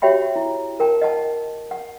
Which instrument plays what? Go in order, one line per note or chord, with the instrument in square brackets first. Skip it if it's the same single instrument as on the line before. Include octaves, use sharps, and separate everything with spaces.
[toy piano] F#4 G4 C#5 E5 G5 B5
E4
A#4 G5 A5
D#5 F#5 A5
F#5